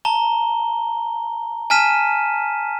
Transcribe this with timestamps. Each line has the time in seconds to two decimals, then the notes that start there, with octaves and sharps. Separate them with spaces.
0.05 A5 A#5 G7
1.70 G#5 A5 F6 B6 D#7 E7